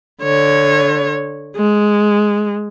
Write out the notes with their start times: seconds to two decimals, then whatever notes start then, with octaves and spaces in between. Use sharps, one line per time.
0.22 D3 C#5
1.57 G#3